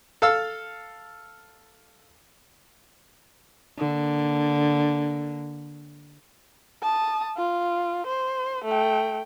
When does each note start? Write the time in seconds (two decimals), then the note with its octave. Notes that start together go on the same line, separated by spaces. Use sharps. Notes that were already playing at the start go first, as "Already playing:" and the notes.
0.22 A4 F5 E6
3.78 D3 A#3
6.83 A5 D#6
7.37 F4
8.06 C5
8.65 A3 G5